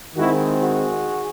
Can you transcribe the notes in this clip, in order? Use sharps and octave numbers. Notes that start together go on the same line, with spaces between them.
D#3 G#3 C4 E4 F#4
F#4 G#4